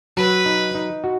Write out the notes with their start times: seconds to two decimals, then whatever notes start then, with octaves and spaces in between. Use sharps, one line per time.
0.17 F#3 B4
0.45 D#4
0.75 D#4
1.04 F#4